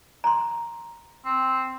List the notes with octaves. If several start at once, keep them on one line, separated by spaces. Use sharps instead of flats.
A#5 C6
C4